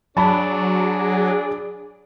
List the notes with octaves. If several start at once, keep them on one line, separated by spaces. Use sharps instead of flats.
F#3 D4 G#4 A5 B5